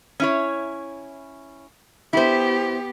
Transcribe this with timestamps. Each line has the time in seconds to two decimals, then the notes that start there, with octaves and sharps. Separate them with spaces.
0.20 C#4 E4 C#5
2.13 B3 E4 G4 C5